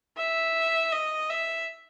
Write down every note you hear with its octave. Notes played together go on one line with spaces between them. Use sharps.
E5
D#5
E5